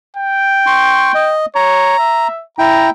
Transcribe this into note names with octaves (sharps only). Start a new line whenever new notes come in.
G5
C6 C#6
D#5
C#5 A#5
E5
E4 G5 A#5